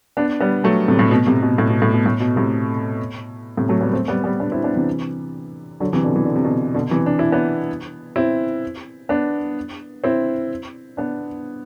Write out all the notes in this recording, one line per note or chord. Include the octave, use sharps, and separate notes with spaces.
B3 D4
G3 B3
F#3 A3
A2 C3
A2
B2
A2 C3
B2
A2
B2
A2
B2
A2
B2
A2 C3
A2 C3
F#3 A3
G3 B3
A3 C4
G3 B3
G3 B3
B3 D4
C4 E4
B3 D4
C3 E3
D3 F#3
C3 E3
B2 D3
E3
D3
C3
B2 D3
B2 D3
C3 E3
D4
E4
B3 D4
C4 E4
B3 D4
C4 E4
B3 D4